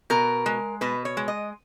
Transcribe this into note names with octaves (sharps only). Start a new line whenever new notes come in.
B2 A#4
G#3
B2 B4
C#5
G#3
D#5